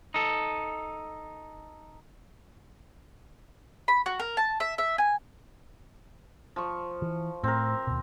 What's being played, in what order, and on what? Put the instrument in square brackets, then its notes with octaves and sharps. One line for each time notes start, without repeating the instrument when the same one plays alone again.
[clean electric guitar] D#4 A4
[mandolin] B5
F#4
A#4
A5
E5
E5
G#5
[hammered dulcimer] F3 C#6
[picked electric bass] E3
[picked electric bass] A2 [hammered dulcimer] C4 A#4
[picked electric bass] D#2 B2